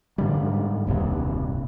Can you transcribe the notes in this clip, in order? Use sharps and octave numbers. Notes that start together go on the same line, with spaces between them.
G#2 D3 G3
D#1 C2 G2